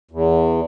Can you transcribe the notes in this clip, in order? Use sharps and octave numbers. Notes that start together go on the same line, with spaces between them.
E2